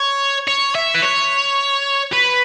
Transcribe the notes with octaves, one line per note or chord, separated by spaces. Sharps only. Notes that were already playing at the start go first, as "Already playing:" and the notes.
Already playing: C#5
C#5
E5
B4
C#5
B4